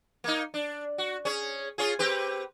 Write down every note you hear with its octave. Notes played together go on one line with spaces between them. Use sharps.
A#3 D#4
D4
F#4
C#4 G#4 C#5
C#4 F4 G#4
C4 G4 B4